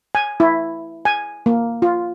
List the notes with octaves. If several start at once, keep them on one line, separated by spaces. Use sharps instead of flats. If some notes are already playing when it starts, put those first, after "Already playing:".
G#5
E4
G#5
A#3
F4